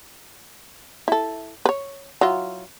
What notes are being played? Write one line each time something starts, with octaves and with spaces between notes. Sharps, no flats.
E4 A4
B4 C#5
F#3 E4 F4